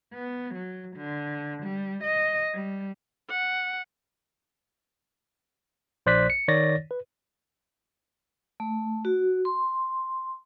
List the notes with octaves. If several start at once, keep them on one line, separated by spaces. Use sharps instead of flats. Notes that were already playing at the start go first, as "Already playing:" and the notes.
B3
F#3
D3
G3
D#5
G3
F#5
A#1 C5 D5 F#6 B6
C#7
D#3 C#5 D5 A6 A#6
B4
A3
F#4
C6